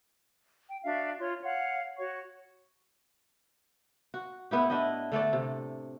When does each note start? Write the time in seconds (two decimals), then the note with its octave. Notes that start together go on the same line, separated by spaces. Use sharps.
0.69 G5
0.84 D4 F#4 E5 F5
1.19 F4 C#5 C6
1.42 C#5 F5 F#5
1.98 F#4 C#5 C#6
4.14 F#4
4.51 A2 B3 E4 G4
4.70 D4 E4 G4 D#5
5.12 D3 A3 A4 D5
5.33 C3